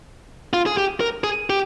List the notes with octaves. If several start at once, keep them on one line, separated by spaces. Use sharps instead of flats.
F4
G#4
G4
A#4
G#4
G4